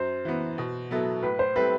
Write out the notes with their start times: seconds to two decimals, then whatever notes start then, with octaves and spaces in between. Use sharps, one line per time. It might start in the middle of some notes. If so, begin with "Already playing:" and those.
Already playing: F#2 C5
0.25 E3 B3
0.58 B2
0.91 F#3 B3 E4 A4
1.23 A2 B4
1.39 C5
1.55 G3 C4 E4 A4 B4